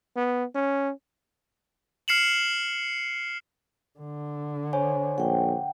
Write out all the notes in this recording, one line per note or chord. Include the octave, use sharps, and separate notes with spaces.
B3
C#4
F6 C7 C#7 E7 F#7
D3
C5 C#5 G#5
A#1 F#5 G5